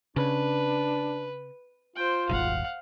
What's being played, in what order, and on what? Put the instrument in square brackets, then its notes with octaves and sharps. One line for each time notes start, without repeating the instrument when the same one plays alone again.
[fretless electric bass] C#3 [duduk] D4 [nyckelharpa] B4
[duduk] F4 [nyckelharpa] C5 G5
[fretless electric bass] D#1 G#1 [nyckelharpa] F5 F#5